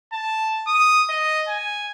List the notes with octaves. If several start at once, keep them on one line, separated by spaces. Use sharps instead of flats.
A5
D#6
D#5
G#5